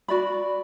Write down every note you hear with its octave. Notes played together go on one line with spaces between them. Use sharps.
F#4 D5 B5